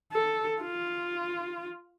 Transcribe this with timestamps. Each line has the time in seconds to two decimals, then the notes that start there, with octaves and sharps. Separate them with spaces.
0.13 A4
0.62 F4